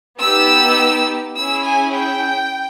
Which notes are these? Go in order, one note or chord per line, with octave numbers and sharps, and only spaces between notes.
B3 D#4 G4 E6
C#4 E4 G#4 E6
G#5
G5